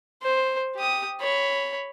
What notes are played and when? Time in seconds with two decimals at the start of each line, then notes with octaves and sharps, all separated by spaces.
0.23 C5
0.75 G4 D#6
1.21 C#5 B5